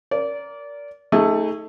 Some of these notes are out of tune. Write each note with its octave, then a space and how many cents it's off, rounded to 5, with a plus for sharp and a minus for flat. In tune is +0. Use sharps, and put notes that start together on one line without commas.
A#4 +0 D5 -25
A3 +10 D#4 +25 G#4 -20